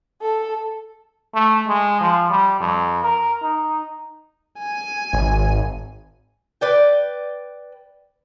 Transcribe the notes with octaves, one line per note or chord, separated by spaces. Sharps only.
A4
A3
G#3
F3
G3
F2
A#4
D#4
G#5
G#1
B4 D5 G5